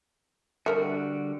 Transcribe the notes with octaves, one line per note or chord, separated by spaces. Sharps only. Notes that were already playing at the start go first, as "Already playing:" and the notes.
D3 G3 F#4 A4 A#4 E5